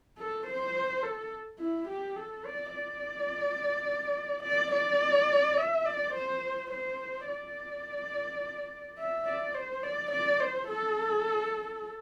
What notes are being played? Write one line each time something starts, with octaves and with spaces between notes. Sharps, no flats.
A4
C5
A4
E4
G4
A4
D5
D5
D5
D5
E5
D5
C5
C5
D5
E5
D5
C5
D5
D5
C5
A4